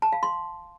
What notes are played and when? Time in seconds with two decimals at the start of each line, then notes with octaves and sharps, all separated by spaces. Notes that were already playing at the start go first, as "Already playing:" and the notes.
0.02 A5
0.12 F5
0.23 C6